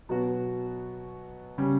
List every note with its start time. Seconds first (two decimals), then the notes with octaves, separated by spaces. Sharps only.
0.09 B2 F#3 B3 F#4
1.58 C#3 G3 C#4